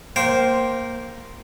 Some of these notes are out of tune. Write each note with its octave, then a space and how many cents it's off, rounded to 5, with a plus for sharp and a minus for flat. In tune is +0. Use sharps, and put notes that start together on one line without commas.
A#3 +0 C5 +0 G5 -25